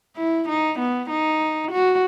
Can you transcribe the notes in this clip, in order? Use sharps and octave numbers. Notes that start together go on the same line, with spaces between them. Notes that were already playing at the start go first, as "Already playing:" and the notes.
E4
D#4
B3
D#4
F#4